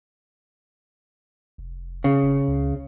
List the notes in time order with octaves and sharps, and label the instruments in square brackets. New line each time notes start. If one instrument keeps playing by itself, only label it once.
[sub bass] F1
[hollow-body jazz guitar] C#3
[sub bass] F#1
C#2